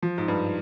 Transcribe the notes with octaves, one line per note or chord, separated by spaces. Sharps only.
F3
G#2
G2